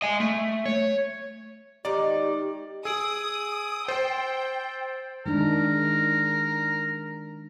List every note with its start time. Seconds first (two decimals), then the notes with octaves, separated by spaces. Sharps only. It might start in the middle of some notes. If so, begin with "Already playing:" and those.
0.02 D#5 G#5
0.20 A3
0.65 C#5
1.85 D#3 G#3 D#4 G4 D5
2.85 G#4 D#6 E6 D7 F#7
3.88 C5 G5 A6
5.26 D#3 G#3 D4 A#4